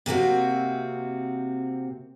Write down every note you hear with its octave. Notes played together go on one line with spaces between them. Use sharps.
C3 A#3 C4 F#4